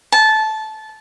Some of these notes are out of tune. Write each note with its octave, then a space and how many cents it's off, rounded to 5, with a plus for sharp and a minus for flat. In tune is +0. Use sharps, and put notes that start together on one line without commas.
A5 -15